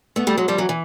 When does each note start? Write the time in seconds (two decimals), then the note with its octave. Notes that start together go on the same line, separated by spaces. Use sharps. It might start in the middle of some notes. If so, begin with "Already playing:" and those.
0.16 A3 B3
0.27 G3 A3
0.38 F#3 G#3
0.48 F3 G3
0.58 E3 F#3
0.69 E3